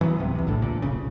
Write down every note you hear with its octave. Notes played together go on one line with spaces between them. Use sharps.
E3 F#3 G#3 B3
D1 C#2 C3
E2 C3
A#1 A2 D3
A#2
E1 B1 C#3